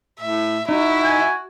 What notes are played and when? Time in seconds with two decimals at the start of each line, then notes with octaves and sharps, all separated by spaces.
0.21 A2 E5
0.69 D#4 E4 F#4
1.03 G#5